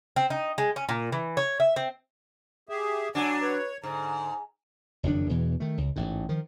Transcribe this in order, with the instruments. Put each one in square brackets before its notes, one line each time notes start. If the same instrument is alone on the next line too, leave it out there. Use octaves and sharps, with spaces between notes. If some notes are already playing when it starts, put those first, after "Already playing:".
[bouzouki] C4
D#4
G#3
C#4
A#2
E3
C#5
E5
C4
[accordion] G4 G#4 E5
[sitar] F#3 D4 [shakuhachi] F#5 [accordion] G#5
[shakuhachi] B4 [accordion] C#5
[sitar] G#2 [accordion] D3 [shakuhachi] A#5
[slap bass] F#1 F2 D#3 D4
E2 B2 E3
D#3 A3
C#2
A1 G#2
D#3 F3